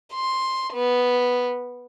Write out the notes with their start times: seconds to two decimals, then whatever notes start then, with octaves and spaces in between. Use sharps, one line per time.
0.14 C6
0.73 B3